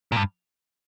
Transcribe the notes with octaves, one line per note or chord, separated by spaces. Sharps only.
A#2
G2